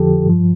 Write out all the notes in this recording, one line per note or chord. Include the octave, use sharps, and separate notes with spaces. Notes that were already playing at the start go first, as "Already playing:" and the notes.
Already playing: F2 D3 F3 G4 A4
G2 F3